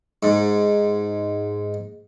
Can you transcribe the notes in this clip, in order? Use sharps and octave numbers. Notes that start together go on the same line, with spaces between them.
G#2